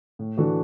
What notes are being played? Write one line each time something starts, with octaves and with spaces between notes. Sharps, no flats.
A2
E3 A3 D4 F#4